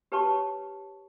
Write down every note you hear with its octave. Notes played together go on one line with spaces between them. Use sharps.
G4 B4 C#5 A5 C#6